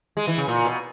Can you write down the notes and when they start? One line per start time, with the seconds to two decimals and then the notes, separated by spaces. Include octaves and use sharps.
0.17 G#3
0.27 E3
0.38 C#3
0.48 A#2
0.65 B2